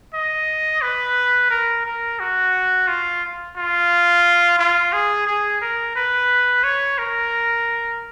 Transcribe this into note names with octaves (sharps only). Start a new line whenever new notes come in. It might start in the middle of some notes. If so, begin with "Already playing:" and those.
D#5
B4
A#4
A#4
F#4
F4
F4
F4
G#4
G#4
A#4
B4
C#5
A#4